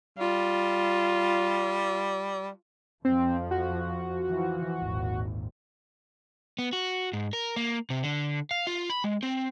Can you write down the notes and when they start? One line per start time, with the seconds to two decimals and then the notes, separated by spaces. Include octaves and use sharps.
0.19 G3 F4
3.05 F2 F3 C4
3.51 F#4
4.28 E3 F3
4.78 G#1 D#2 A#2
6.59 B3
6.73 F#4
7.13 G#2
7.33 A#4
7.56 A#3
7.90 C3
8.03 D3
8.51 F5
8.67 F4
8.90 B5
9.04 G#3
9.23 C4